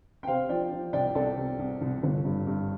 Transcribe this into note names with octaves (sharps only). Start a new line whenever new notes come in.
G5
C3 C5 F5
F3 D5 G5
F3
C2 D5 G5
C2 A4 D5
C3
C2
C2
G1
G2
G2